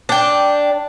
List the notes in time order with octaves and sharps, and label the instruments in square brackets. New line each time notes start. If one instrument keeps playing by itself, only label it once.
[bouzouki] D4 G5